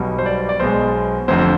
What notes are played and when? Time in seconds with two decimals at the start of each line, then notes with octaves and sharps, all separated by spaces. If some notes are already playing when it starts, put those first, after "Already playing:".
Already playing: B1 B2 G3
0.19 C5
0.26 D5
0.49 D5
0.60 B1 B2 G#3 C5
1.28 F1 F2 D3 C5